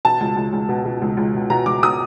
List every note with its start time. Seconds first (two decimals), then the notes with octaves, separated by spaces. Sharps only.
0.05 B2 A5
0.20 C#2
0.36 C#2
0.53 C#2
0.69 B2
0.85 B2
1.02 C#2
1.17 C#2
1.35 B2
1.50 B2 A#5
1.66 C#2 D6
1.83 B2 D#6